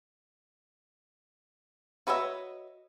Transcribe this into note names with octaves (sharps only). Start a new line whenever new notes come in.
F#4 B4 C#5 D#5 E5